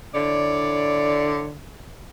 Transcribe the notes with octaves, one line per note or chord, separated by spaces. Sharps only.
D3 E4 C#5 D5